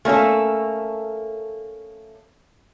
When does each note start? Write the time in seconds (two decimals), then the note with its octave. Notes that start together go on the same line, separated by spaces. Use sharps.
0.05 A3 A#3 C#4 A4